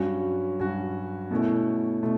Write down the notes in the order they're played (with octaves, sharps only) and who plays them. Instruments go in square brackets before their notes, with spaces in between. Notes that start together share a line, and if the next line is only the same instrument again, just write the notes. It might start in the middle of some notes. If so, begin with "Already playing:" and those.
Already playing: [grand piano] G2 F#3 C#4 F#4
G2 F#3 C#4 F#4
B2 A3 C#4 E4
B2 A3